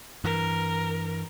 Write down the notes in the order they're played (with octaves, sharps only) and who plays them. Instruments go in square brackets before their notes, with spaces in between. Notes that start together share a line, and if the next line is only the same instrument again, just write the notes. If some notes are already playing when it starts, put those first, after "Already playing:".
[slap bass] G2 E3 [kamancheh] A#4